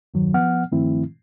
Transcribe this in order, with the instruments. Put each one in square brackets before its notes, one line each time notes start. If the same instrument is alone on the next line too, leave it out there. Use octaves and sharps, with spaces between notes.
[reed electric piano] E2 G2 D#3 F#3
F3 B3 F#5 F6
G2 D#3 F3 A3 C4 E4